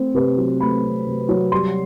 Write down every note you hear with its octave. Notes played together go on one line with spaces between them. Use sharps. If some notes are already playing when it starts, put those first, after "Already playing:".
Already playing: A3 C4 C5
C3 B4
F#3
A3 B5
C4
C3
F#3
G3 C6